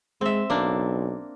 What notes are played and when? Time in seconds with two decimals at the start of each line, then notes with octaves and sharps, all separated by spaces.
0.21 G#3 C4 E5
0.50 B1 A#3 D4